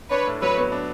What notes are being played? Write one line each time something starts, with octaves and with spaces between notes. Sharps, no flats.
D4 B4 C#5
A2
F#3 B4 C#5
B3
D4